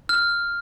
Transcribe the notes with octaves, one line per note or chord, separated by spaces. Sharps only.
F6